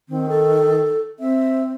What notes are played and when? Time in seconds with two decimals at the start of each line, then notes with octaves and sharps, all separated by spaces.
0.09 D#3 C4
0.29 A4
1.20 C4 E5